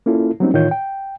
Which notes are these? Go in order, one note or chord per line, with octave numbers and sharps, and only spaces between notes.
A#3 C#4 E4 F4 A4
F#3 G3 A#3 C4 C#4 D#4
A2 D#3 E3 F4 C#5 G6
G5